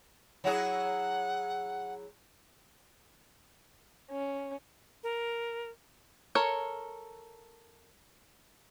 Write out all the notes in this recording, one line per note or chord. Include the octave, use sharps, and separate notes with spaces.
F#3 E4 G#4 F#5
C#4
A#4
A4 A#4 C#5